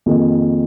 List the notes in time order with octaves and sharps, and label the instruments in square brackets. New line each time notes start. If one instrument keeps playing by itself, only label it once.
[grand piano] F2 D#3 A#3 F4 G#4